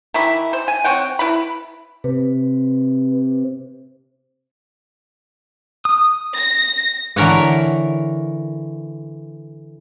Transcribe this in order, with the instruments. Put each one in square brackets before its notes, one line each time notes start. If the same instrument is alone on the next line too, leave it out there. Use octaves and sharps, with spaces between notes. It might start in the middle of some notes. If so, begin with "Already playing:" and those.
[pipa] D#3 E3 E4 B5
C5
G#5
C4 C#5 F#5 G5
E4 B4 B5
[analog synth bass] C3 [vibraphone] B4
[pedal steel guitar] D#6
[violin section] A#6
[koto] D3 E3 A#4 C#5 F#5